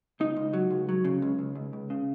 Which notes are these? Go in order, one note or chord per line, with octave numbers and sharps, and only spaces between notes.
C#2 D#4
C#2
F#3
C#2
F#3
C#3
C#2
C#2
C#2
C#2
C#3